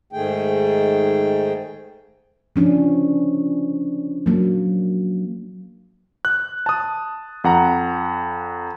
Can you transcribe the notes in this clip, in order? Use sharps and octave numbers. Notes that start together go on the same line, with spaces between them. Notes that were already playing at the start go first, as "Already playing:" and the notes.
G#2 D#3 A3 G#4 G5
F3 C#4 D4
F#3 A#3
F#6
A5 D#6
F2 F#5 A#5